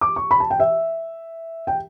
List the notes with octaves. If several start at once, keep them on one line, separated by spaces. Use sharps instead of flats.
D6
C#6
B5
A5
G5
E5
G5